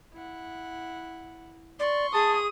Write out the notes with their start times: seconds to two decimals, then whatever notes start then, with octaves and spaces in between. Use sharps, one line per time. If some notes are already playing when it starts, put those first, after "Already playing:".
0.12 E4 F#5
1.79 D5 C6 C#6
2.14 G#4 A5 D#6